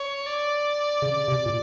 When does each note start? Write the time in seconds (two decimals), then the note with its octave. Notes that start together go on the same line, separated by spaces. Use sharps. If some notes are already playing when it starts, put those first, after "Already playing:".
Already playing: C#5
0.26 D5
1.02 C#3
1.28 C3
1.46 A#2